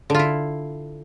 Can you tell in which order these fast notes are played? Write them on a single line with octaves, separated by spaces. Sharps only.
D3 F4 E4